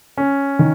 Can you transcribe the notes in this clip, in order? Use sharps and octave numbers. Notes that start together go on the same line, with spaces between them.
C#4
D#3